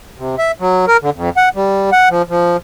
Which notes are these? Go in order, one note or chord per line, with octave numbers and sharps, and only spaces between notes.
C3
E5
F#3
A#4
D3
F2
F#5
G3
F#5
F3
F3